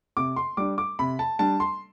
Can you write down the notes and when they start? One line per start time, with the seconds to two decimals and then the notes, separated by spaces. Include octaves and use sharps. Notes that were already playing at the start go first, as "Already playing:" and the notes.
0.17 C3 D6
0.36 C6
0.57 G3 D4 D6
0.78 D6
0.99 C3 B5
1.19 A5
1.39 G3 D4 A5
1.60 C6